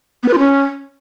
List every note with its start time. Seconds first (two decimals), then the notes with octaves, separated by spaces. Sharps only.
0.23 B3
0.28 B4
0.33 F4
0.38 C#4